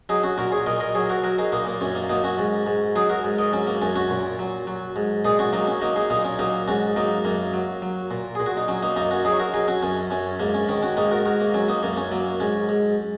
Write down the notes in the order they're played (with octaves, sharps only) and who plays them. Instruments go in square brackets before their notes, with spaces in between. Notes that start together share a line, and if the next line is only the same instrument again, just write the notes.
[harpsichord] F#3 D#4 G#4
C#4 F#4
A#2 F#4 A#4
G#4 C#5
A#2 A#4 D#5
A#4 D#5
F#3 G#4 C#5
F#4 A#4
F#3 F#4 A#4
D#4 G#4
A#2 A#3 D#4
A#3
F#2 C#4
A#3
F#3 A#3 D#4
C#4 F#4
G#2
G#2
F#3 D#4 G#4
F#4 A#4
G#2
A#4 D#5
F#3 C#4
A#3
F#2 C#4
C#4 F#4
A#2
F#3
F#3
G#2
A#2 D#4 G#4
C#4 F#4
F#3 A#3 D#4
C#4
F#3 A#3 D#4
D#4 G#4
A#2 A#3 D#4
C#4
F#3 A#3 D#4
G#2 C#4 F#4
F#3 A#3 D#4
F#2 A#3
F#3
F#3
A#2
A#2 G#4
F#4
D#4
F#3 C#4
A#3 D#4
F#2 A#3 D#4
C#4 F#4
F#3 D#4 G#4
C#5
F#4 A#4
F#3 D#4 G#4
C#4 F#4
F#2 C#4
F#2 C#4
G#2 A#3
C#4
D#3 C#4
C#4 F#4
G#2 A#3 D#4
F#4 A#4
G#2 F#4 A#4
A#3
F#3 C#4
A#3 D#4
F#2 A#3
A#3
C#4
F#3 A#3
G#2 C#4
G#2